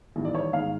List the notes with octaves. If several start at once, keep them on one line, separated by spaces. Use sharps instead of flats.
A1 G2 D#3
D5
C#5
G#2 D#3 F5